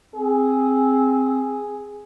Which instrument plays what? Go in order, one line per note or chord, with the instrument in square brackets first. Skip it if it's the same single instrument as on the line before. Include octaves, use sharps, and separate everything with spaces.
[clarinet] C4 [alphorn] G#4